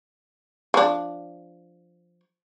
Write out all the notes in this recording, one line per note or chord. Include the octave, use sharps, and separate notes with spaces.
F3 D4